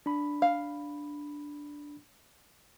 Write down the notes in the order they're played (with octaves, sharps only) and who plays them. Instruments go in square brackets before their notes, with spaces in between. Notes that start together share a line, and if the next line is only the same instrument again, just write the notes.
[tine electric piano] D4 B5
[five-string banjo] F5